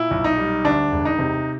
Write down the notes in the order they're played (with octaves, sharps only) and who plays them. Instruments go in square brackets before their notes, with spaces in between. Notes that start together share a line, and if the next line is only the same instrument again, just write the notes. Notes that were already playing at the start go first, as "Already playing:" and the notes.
Already playing: [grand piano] A#2 E4
B1
D#4
G3
D2 D4
E1
D#4
C3